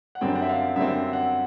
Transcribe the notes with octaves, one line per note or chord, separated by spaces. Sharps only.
F#5
F#2 D3 G3 C4 G5
F#5
E5
F5
F#2 D3 G3 C4 E5
F#5